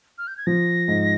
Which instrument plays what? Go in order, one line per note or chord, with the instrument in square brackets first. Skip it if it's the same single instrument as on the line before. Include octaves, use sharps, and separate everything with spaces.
[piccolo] F6
G6
G#6
[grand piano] F3 [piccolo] A#6
[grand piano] G#2